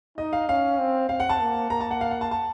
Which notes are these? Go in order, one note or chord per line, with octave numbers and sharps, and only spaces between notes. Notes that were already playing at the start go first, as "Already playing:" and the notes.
D#4 D#5
F5
C#4 F5
C4
C4 F5
F#5
A5
A#3
A#3 A#5
A5
F#5
F5
F#5
A5
A5